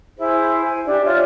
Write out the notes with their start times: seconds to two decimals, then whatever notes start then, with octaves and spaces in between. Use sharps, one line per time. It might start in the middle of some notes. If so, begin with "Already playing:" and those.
0.19 E4 G#4 C5
0.64 G#5
0.85 D4 G4
1.05 F4 C#5 D5 E5